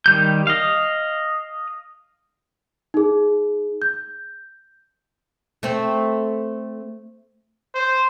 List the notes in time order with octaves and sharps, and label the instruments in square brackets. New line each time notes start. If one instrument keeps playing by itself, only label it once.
[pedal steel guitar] D#3 G3 G6
D#5 F5
[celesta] D#4 G#4
G6
[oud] A3 C4
[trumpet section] C5